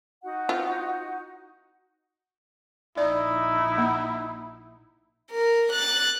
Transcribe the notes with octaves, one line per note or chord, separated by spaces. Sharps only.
D#4 F#4 F#5
C4 E4 F4
A#1 D#4 E4 D5
A#3
A#4
F#6 A6